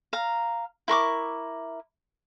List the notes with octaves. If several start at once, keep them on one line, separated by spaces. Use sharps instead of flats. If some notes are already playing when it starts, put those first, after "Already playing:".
F5 A#5
E4 A#4 C#6 D6